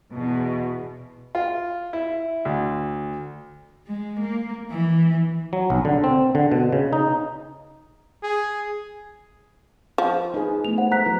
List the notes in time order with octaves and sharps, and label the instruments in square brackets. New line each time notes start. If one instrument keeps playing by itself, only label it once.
[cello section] E2 B2
[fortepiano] F4
E4
D2
[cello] G#3
A#3
E3
[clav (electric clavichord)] F#3
B1
D3
C4
D3
B2
C#3
D#4
[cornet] G#4
[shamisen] F3
[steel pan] D#4 G#4 [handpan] B4
[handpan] A3 B3 E4 [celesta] F7
[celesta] C5 F#5
[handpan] G#3 C5 E5 [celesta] A#5 F#6 B6
[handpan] F#3 E4 B4